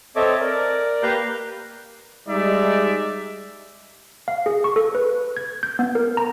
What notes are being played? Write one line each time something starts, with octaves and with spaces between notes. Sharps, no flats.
C4 A4 C#5 D#5 E5 D6
A#4 D5
A#3 G4 B4 F5 A#5 G6
G3 G#3 D#4 D5 E5
F5
G#4
C#6
A4
B4
G#6
G6
B3
A#4
A#5